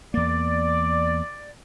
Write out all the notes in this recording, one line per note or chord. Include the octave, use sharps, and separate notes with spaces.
E2 A#3 D5